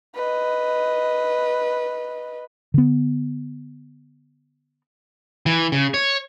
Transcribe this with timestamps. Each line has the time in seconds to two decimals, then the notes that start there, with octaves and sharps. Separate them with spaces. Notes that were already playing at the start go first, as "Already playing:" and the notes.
0.15 B4 D#5
2.74 D3 B3
5.46 E3
5.72 C#3
5.94 C#5